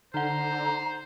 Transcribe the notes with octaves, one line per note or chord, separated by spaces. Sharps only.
D3 D#4 C5 F#5 A#5